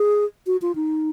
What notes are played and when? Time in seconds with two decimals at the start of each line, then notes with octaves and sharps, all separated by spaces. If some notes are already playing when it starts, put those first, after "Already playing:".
Already playing: G#4
0.47 F#4
0.62 F4
0.75 D#4